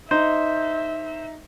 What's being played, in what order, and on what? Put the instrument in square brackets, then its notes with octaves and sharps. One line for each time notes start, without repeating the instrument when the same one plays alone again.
[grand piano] D#4 [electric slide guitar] C5 [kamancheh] E5